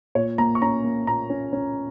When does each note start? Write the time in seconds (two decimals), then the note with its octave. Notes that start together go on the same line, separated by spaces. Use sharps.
0.15 A#2 C#5
0.38 A#3 A#5
0.55 C#6
0.62 C#4 A#5
0.84 A#3
1.07 A#2 A#5
1.30 C#4
1.53 C#4